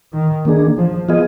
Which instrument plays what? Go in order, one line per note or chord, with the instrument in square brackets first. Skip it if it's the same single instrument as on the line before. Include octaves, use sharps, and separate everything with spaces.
[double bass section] D#3
[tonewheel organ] D#3 A#3 D4 G#4
[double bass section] F3
[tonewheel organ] F3 B3 F4 G#4 D#5